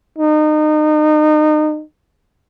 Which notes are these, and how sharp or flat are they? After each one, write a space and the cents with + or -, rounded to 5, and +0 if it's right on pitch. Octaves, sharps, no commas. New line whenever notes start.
D#4 -30